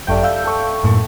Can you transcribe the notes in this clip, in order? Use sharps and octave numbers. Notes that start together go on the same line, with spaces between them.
G#1 F#2 G3 A3 G5 G6
F5 E6 G6
A4 C#6
F#2 A2 A#3